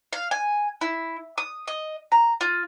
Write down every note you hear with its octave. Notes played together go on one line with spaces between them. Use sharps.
F5
G#5
E4
D#6
D#5
A#5
F4